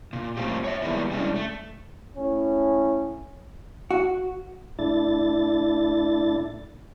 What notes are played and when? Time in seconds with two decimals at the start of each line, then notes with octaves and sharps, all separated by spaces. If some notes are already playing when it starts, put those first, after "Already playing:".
0.13 A#2
0.37 F#3 A3 A#3 C4 F4 G4
0.64 C#5 E5
0.82 D#3 G3 G#3 A#3 B3 E4
1.11 G3 G#3 A#3 C#4 D4 E4
1.36 A3
2.16 A2 C#4
3.91 F#4
4.79 A2 D4 E4 A6